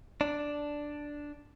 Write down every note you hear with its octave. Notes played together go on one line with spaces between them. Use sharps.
D4